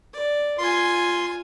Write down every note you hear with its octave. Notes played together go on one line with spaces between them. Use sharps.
D5
F4 G#5 C6